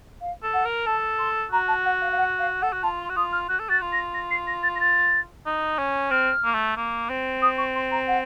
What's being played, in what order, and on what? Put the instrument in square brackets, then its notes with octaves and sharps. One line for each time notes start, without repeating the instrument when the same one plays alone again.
[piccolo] F5
[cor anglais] A4
[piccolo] F#5
[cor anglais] A#4
[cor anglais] A4 [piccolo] A5
[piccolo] C6
[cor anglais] F#4 [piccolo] A#5
[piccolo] A5
F#5
F5
F5
F#5
F5
[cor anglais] A4 [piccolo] F#5
[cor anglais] F#4
[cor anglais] F4 [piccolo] A5
[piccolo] C6
[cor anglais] F#4
[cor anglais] F4 [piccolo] D#6
[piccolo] F6
[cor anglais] F#4 [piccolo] F#6
[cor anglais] A4
[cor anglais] F#4 [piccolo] A6
[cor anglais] F4
[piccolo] A#6
A#6
C7
A#6
A6
A#6
A6
[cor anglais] D#4
C#4
[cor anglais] C4 [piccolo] F6
[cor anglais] A#3
A3
A#3
C4
[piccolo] D#6
C#6
C6
A#5
F#5